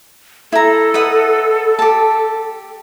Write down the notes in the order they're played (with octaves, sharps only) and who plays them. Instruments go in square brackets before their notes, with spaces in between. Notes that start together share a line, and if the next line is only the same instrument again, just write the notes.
[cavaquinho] E4 A#5 [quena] A4
[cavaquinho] B4 D#5 F#5
G4 A5